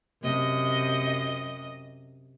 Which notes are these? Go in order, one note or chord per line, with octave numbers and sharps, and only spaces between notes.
F#2 C3 D#5